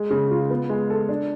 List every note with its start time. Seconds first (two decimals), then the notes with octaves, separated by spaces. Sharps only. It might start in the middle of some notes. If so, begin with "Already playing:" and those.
Already playing: G#3
0.10 C#3
0.31 F4
0.50 B3
0.69 G#3
0.90 A4
1.09 D4